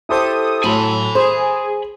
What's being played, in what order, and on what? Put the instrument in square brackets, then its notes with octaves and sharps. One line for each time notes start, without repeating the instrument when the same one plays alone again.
[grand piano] E4 G4 C5 [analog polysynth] A4 D#6
[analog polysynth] A2 F#3 [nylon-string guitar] A4 [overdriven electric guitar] G#5 B5 [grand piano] C6
[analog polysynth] G#4 [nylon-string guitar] C5